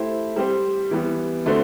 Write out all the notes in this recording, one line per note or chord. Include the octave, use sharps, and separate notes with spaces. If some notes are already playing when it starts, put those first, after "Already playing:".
Already playing: A3 E4 G4 C5
G3 C4 G4 C5
E3 G3 B3
D3 A3 D4 F#4 C5